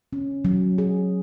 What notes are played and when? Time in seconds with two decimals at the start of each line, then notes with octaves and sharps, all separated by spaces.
0.13 C#4
0.45 F#3
0.78 G#4